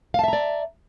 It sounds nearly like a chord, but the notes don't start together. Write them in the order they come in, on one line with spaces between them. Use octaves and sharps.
F5 A5 E5 A#5 D5